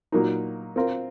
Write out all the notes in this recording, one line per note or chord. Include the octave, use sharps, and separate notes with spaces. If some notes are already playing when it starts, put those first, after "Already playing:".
A#2 F#3 A#3 D#4
C4 F4 A#4